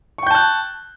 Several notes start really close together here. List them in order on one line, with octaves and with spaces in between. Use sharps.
C#6 G5 G6 A5 F#6